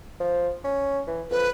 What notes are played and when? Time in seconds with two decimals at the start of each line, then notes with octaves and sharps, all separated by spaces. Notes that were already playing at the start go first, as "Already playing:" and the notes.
0.20 F3
0.64 C#4
1.07 E3
1.31 F2 B4